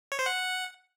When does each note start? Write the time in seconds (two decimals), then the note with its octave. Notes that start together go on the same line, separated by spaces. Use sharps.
0.12 C#5
0.19 C5
0.26 F#5